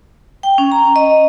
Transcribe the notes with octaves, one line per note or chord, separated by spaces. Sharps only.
G5
C#4
A#5
D#5